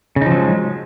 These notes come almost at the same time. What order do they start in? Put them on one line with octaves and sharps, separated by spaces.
C#3 D#4 F3 F#3 G#3